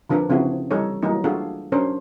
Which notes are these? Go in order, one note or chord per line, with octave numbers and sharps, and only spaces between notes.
D3 F3 D4 A#4 B4
C#3 F3 C4 E4 F#4 G#4
E3 G3 D#4 A4 C#5
E3 F#3 G3 A#3 D#4
A3 D4 F4 F#4 G#4 A4
F#3 C#4 D4 A#4 C5 C#5